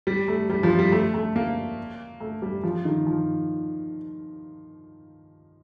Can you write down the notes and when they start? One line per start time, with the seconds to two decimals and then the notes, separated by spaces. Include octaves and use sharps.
0.07 G3
0.28 A3
0.50 G3
0.63 F3
0.79 G3
0.92 A3
1.14 A3
1.36 A#3
2.20 A3
2.42 G3
2.63 F3
2.85 D#3
3.07 F3